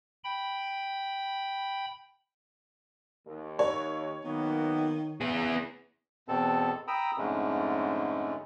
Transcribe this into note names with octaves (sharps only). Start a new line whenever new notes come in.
G5 B5
D#2
C#5
D#3 F#3 A#3 B3
E2 C#3 B3 G#4
E2 B2 C4 A4 A5
G5 A#5 B5 D#6 E6
F2 G#2 D3 G#3 A3 C#4